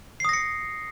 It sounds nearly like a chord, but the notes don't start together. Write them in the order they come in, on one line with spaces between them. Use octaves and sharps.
C7 D#6 A#6 C#7